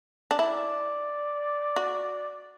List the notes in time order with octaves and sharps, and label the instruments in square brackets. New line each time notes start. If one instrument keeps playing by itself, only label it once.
[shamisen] D4
[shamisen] E4 [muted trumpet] D5
[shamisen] F#4